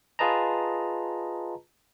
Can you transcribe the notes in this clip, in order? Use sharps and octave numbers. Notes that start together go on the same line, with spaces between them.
F4 G#4 B4 D#5 A5 A#5